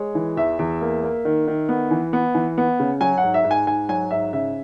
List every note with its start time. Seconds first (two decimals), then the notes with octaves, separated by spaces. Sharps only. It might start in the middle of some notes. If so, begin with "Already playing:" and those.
Already playing: G#3 C#5
0.15 E3
0.37 E2 E5
0.59 E2
0.81 A#3
1.04 A#3
1.25 D#3
1.48 D#3
1.69 B3
1.91 E3
2.13 B3
2.35 E3
2.58 B3
2.80 C#3
3.00 F#3 G#5
3.18 F#5
3.24 G#2
3.34 E5
3.44 G#2
3.51 G#5
3.67 G#2 G#5
3.89 F#3 G#5
4.11 G#2 E5
4.33 C#3 E5